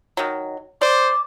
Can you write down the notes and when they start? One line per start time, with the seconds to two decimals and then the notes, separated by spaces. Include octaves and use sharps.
0.17 D#3 F#3
0.81 C5 D5 D6